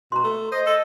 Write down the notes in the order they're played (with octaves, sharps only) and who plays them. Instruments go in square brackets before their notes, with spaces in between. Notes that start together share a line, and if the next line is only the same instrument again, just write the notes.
[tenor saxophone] B2 [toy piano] A#5 C6
[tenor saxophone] A3
[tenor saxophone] C5 [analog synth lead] D#5
[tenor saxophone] A4